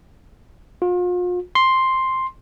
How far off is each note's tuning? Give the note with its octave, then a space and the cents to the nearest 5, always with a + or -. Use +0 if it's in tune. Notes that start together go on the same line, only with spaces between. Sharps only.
F4 +40
C6 +5